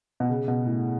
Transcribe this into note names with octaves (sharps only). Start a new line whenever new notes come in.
B2
C#3
B2
A2